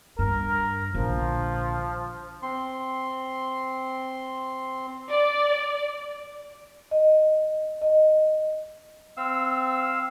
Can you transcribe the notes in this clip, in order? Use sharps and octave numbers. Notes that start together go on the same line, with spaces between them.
G2 A#4
A#1 D3 F3
C4 C6
D5
D#5
D#5
C4 F5 E6